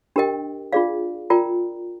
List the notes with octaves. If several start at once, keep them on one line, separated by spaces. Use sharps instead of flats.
D4 G4 A#4 D#5 G5
D4 F4 G#4 D5 F5
F4 A#4 D5 G5 A#5